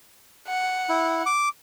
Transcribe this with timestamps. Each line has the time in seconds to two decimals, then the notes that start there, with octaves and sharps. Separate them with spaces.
0.48 F#5
0.89 E4
1.26 D6